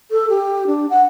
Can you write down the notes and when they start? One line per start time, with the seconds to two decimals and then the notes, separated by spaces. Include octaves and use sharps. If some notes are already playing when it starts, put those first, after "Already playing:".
0.11 A4
0.30 G4
0.67 D4
0.90 F#5